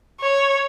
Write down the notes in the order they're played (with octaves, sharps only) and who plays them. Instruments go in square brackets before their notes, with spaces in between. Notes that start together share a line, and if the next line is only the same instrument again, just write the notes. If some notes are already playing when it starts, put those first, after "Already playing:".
[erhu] C#5